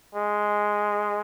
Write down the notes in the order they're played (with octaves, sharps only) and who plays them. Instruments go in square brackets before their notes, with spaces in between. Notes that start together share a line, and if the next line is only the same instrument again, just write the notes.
[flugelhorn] G#3